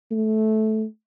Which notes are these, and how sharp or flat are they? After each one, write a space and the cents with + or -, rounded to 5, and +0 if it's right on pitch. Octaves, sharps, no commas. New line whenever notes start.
A3 -15